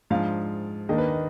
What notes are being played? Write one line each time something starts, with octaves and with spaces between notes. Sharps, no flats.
G#2 F3 G#3 D4 F5
D#2 D#3 A#3 D4 D#5
B4
D#5